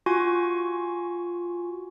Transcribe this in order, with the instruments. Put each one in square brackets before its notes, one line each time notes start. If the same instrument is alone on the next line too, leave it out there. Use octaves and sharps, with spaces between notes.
[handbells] F4 F#4 G#5 C#6